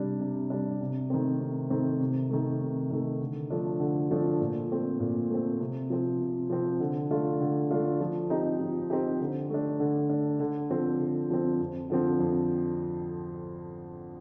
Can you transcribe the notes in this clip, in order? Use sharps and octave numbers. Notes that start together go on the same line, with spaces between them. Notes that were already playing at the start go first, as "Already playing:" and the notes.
Already playing: C3 G3 D4
C3
G3 D4
C3
D#3 A3 C4
C3
D#3 A3 C4
C3
D#3 A3
C3
D#3 A3
D3
F3 A3 D4
D3
F3 A3 D4
A#2
A3 C4
A#2
A3 C4
C3
F3 C4
C3
F3 C4
D3
A3 D4 F4
D3
A3 D4 F4
F3
C4 D#4 G4
F3
C4 D#4 G4
D3
A3 D4
D3
A3 D4
D3
F3 C4
D3
F3 C4
F2
D3 F3 C4
F2